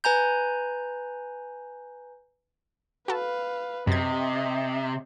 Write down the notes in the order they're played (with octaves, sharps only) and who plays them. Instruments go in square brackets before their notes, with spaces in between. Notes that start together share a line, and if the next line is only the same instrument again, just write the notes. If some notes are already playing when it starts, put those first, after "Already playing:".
[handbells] B4 G#5 A#5 G6
[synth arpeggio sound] F#4 A4 [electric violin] B4 F5
[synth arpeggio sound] F#2 G#6 [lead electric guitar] C3 [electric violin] D#5